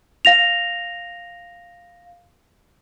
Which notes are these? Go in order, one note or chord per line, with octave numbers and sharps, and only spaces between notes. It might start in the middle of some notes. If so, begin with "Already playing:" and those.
F5 A#6 F7